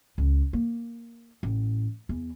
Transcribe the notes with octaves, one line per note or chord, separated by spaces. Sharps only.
C#2
A#3
A1
E2